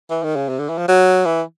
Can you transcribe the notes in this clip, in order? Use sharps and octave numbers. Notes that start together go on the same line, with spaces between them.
E3
D#3
C#3
C3
D3
E3
F3
F#3
E3